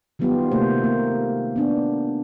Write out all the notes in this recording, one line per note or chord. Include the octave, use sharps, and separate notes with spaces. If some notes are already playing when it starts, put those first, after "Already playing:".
D#3 F#3 G3 B3 F4 G4
C3 A3 A#3 C5
A#3
B3 D4